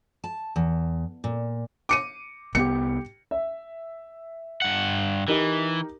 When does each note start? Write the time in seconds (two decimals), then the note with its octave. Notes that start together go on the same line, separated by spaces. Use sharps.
0.24 A5
0.56 E2
1.24 A#2
1.89 D6 C#7 D#7
2.55 C2 B3 G4 C#7
3.31 E5
4.62 G2 F#5
5.28 E3 D#4 G4 A#4